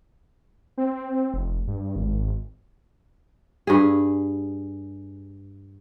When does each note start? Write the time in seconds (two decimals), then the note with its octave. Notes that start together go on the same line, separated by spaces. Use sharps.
0.78 C4
1.34 F1
1.67 G2
1.96 G#1
3.67 G2 G#4